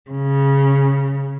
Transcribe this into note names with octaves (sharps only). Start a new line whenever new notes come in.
C#3